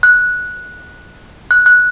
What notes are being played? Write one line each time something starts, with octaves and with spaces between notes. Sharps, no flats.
F#6
F#6
F#6